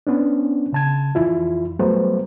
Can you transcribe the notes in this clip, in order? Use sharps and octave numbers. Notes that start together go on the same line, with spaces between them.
B3 C#4 D4
C#3 A5 G#6
F2 E3 E4 F4
F#3 G3 A3 B3 B4 C5